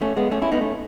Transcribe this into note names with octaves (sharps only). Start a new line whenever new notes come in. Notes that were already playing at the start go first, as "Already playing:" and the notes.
A3 C#4
G#3 B3
A3 C#4
C#4 E4
B3 D#4
A3 C#4